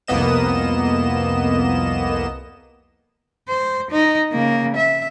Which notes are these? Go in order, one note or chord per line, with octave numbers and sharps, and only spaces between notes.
C2 F2 A#3 B3 D#5 E7
C5
D#4
C#3 A#3
E5